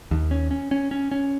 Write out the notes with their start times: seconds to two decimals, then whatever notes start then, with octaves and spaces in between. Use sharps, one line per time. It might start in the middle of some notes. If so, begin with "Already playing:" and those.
0.11 D#2
0.31 C#4
0.51 C#4
0.71 C#4
0.91 C#4
1.11 C#4